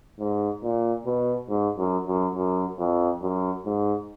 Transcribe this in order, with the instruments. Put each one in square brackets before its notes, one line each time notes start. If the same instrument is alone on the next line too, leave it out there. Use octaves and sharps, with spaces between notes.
[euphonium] G#2
A#2
B2
G#2
F#2
F#2
F#2
F2
F#2
G#2